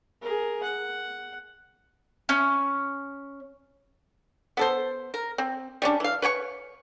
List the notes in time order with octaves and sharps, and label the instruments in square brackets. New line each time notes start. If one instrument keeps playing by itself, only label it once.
[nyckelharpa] G#4 A#4
F#5
[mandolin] C#4
[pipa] B3 A4 C5
A#4
C4
G3 C#4 D4
E3 F5
B4 C#5 G5 C#6